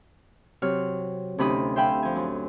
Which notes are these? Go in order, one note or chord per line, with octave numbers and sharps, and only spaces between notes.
C3 F#3 C#5 F6
D2 C3 C#4 D#4 B5 D#6
C5 E5 F5 G5 G#5 B5
F3 G#5
F#2